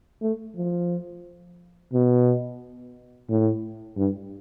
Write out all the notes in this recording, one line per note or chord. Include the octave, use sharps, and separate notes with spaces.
A3
F3
B2
A2
G2